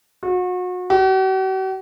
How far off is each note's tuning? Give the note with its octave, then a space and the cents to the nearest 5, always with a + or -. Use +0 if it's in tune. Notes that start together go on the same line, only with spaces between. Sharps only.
F#4 -35
F#4 +45